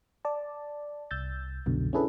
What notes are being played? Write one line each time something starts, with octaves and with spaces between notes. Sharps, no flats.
D5 A5
C2 E6 G6 A6
C2 F#2 B2 D3
C#4 D4 E4 G#4 A4 B4